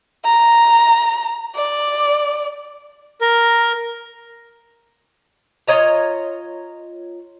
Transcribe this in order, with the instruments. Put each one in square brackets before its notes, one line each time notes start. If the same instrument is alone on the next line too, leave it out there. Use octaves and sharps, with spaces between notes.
[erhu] A#5
D5
[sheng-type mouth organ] A#4
[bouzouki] F4 C#5 D#5 A#5